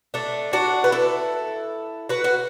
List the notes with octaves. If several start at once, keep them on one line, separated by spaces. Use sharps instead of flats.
A3 D4
D4 F#4
B4
E4 A4
F#4 B4
F#4